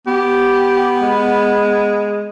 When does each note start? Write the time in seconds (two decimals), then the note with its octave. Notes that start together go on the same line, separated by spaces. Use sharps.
0.07 B3 G4
1.02 G#3